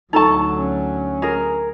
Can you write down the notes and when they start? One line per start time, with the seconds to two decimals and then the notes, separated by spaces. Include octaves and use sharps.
0.13 D2 F#3 D#4 A4 A5 A#5 C#6
0.56 C#4
1.22 G#4 A#4